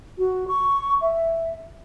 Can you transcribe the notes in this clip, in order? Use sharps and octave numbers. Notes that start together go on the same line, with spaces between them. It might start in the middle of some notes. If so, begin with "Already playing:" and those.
F#4
C#6
E5